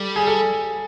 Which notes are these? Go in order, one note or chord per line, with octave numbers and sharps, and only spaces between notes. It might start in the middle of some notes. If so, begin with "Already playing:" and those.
Already playing: G3 A4
G#4
A4